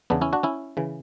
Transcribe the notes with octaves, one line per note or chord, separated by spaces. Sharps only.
E2 C#3 E3 B3 D4
C#4 E4
D4 F#4
C#4 E4
C#3 E3